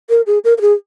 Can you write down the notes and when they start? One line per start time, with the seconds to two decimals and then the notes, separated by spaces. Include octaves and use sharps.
0.10 A#4
0.27 G#4
0.44 A#4
0.58 A#4
0.61 G#4